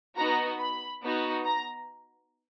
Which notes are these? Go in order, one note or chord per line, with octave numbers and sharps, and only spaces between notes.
B3 D#4 F#4 A#5
B5
B3 D#4 F#4
A#5